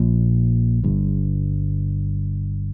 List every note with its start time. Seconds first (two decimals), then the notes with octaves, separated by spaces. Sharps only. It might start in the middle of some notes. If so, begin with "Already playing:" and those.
Already playing: A#1 A#2
0.84 G1 G2